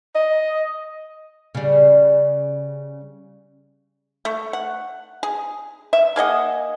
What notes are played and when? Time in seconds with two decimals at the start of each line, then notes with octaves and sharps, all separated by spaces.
0.15 D#5
1.55 C#3 G3
4.25 A3
4.53 F#5
5.23 G#4
5.93 E5
6.16 A#3 G#4 D#5 F#5